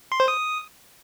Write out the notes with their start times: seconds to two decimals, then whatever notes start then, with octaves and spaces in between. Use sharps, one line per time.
0.12 C6
0.20 C5
0.28 D#6